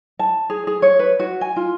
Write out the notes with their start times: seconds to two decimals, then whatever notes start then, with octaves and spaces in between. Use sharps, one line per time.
0.19 A5
0.50 G#4
0.67 G#4
0.82 C#5
0.99 B4
1.19 F#4
1.41 G#5
1.56 F4